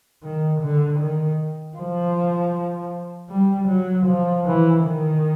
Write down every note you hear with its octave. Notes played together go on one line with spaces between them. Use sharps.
D#3
D3
D#3
F3
G3
F#3
F3
E3
D#3